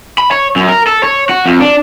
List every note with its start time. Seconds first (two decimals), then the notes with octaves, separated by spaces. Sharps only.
0.18 B5
0.31 C#5
0.56 F#2
0.69 A#4
0.87 A4
1.03 C#5
1.29 F#4
1.46 F2
1.61 D4